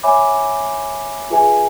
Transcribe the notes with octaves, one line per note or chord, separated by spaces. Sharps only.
C#5 E5 G#5 B5 D6
F4 G#4 B4 E5 G#5